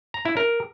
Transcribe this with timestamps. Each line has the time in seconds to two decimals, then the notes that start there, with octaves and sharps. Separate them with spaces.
0.14 A#5
0.25 E4
0.37 A#4